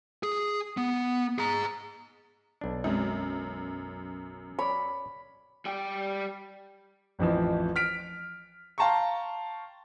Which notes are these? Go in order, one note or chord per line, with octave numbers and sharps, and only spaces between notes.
G#4
B3
G#4 A#5
B1 D4
F#2 G#3 C4 F#4
C#5 D5 B5
G3 G5
A1 F2 E3 F3
F6 B6 D7
F5 G5 A5 A#5 C6 C#6